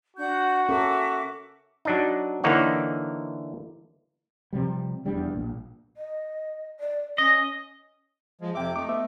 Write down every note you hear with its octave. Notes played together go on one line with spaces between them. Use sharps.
D4 F#4 F#5 G6
C#4 A4 A#4 E5 D6
F#3 D4 D#4
D3 E3 A#3 D#4 C#5 F#5
C3 F3 G3
F1 E2 G3 D4
A#1 A#2
D#5
D5
C#4 D#5
F3 G#3
F2 C3 E5 G5 D6
A3 D#4 D6
B3 E5